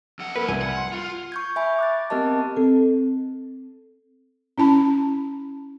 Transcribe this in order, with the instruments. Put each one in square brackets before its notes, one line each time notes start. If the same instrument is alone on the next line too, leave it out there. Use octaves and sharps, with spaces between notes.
[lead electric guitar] F2 F#5
[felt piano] A#3 [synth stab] B4
[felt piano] C2 [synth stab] G#5
[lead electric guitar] F#5
[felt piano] C6
[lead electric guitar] F4
[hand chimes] C#6 G6 G#6
E5 G#5 B5 C#6
D6 F#6 A6
B3 C4 G4 A#4 D#5 A5
[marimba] C4 A4
[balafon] C#4 E4 A5 B5